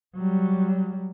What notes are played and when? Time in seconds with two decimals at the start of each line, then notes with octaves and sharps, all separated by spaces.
0.16 F#3 G3